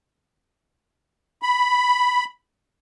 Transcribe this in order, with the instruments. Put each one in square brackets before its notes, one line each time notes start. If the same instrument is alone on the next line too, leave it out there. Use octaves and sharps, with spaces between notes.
[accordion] B5